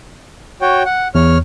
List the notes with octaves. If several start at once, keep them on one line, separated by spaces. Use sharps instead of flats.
F#4 C#5 G5
F#5
E2 C#5 F6